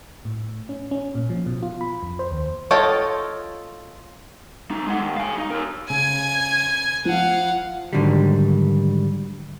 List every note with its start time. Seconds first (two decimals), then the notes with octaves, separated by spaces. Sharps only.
0.25 A2
0.69 C#4
0.91 C#4
1.15 A#2
1.30 F3
1.46 B2
1.63 F4
1.81 B5
2.03 F2
2.19 C5
2.31 D#2
2.71 F4 A4 C#5 D#5 G5
4.71 C#2 D#4
4.87 G#3 F#5
5.01 D#2
5.17 F5 G#5
5.38 D#4
5.50 A#4 C#5
5.90 C#3 G#5 G#6
7.05 F3 F5 F#5
7.93 G#2 B2 D3 D#3 F#3 G3